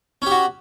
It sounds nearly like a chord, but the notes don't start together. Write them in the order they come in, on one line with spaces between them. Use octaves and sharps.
C#4 G4 F#4